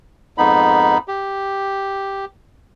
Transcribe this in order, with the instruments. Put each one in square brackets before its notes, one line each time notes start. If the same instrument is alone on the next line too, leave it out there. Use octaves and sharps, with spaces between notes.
[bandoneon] F2 G#2 B3 D#4 B5
G4